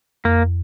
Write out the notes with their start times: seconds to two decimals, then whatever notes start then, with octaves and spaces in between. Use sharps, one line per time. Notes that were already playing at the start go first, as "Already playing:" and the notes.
0.24 F2 A#3